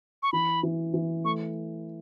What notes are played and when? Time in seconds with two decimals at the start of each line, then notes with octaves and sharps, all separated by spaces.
0.23 C#6
0.33 E3 B5
0.63 E3
0.94 E3
1.24 A3 C#6